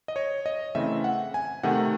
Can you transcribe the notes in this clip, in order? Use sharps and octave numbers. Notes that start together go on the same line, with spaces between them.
D#5
C#5
D#5
C#3 E3 A3 C4 E5
F#5
G#5
C3 D#3 A3 F#5